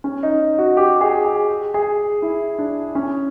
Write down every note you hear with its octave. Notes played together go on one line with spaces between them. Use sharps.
C#4
D#4
F#4
G4
G#4
G#4
G#4
E4
D4
C#4